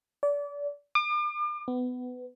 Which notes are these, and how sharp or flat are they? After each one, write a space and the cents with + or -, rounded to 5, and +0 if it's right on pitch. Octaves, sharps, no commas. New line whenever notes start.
D5 -30
D6 +40
B3 +20